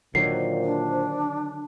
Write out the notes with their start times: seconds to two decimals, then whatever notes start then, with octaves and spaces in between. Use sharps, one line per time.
0.15 A#2 D3 D#3 F#3 C5 C7
0.62 D4